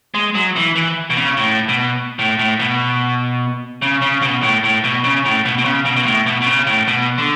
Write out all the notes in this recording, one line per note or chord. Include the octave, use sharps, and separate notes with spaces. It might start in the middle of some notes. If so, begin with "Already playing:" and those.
G#3
F#3
E3
E3
B2
C#3
A2
B2
A2
A2
B2
C#3
C#3
B2
A2
A2
B2
C#3
A2
B2
B2
C#3
B2
B2
A2
B2
B2
C#3
A2
B2
D3